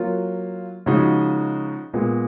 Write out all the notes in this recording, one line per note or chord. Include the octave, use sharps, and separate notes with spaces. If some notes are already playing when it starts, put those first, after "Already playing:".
Already playing: F#3 A#3 F4
C#3 F3 G#3 D#4 F#4
A#2 G#3 B3